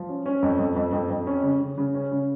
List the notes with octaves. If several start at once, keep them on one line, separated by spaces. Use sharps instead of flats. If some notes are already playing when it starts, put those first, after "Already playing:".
Already playing: F3
C#4
C#4
F2
F2
F2
F2
F2
C#4
C#3
C#3
C#3
C#4
C#3